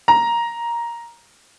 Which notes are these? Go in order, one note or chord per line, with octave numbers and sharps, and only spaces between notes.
A#5